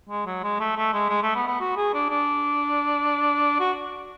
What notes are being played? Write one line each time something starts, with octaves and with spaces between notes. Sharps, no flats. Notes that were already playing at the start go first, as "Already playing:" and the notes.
G#3
F#3
G#3
A3
A3
G#3
G#3
A3
B3
B3
F#4
G#4
D4
D4
F#4